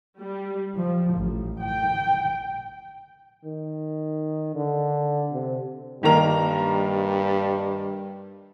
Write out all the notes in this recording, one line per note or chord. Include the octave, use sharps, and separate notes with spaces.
G3
F3
A1
G5
D#3
D3
C3
G2 D#3 A#3 A#5